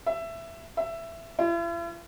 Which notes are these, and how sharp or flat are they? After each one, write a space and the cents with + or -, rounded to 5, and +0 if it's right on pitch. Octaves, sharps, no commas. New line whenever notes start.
E5 +15
E5 +15
E4 +45